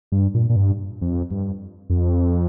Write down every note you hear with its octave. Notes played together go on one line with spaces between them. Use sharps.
G2
A#2
A#2
G2
F2
G2
F2